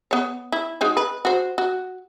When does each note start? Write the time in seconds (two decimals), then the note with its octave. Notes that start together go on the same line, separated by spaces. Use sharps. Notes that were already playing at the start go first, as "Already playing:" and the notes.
0.11 B3 C#5
0.52 E4
0.81 G#3 D#4 F#4
0.97 B4
1.25 F#4 C5
1.58 F#4